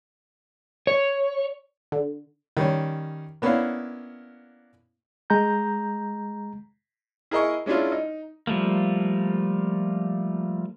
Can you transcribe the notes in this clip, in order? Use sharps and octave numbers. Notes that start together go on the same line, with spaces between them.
C#5
D3
D#3 G3 C#4
A#3 B3 C#4 D4 E4 F5
G#3 A#5 G6
E4 G#4 A#4 D#5 G#5 C#6
G#3 C#4 D4 E4 F4
D#4
F3 G3 A3 A#3